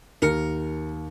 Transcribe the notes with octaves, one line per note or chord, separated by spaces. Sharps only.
D#2 A#4 C#7